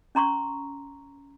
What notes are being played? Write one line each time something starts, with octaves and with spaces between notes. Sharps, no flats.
C#4 A#5 C6 C#6